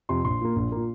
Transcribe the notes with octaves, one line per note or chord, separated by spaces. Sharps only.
F2 C3 C6
A#1 C6
A#2 A#3
A#1
A#2 A#3